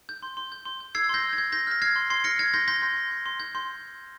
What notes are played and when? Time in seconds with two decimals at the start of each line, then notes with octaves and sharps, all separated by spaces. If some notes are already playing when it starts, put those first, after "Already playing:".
0.09 G6
0.23 C6
0.37 C6
0.52 G6
0.66 C6
0.81 G6
0.95 E6 G#6 C7
1.09 C6 G6 A#6
1.24 C6
1.33 G#6
1.38 G6
1.52 C6 G6 A#6
1.67 F6 A#6
1.82 F6 G#6 C7
1.96 C6
2.10 C6 G#6 C7
2.24 F6 A#6 C#7
2.39 F6 G#6
2.54 C6 G6 A#6
2.68 C6 G6 A#6
2.82 C6
2.97 C6
3.11 C6
3.26 C6
3.40 G6
3.55 C6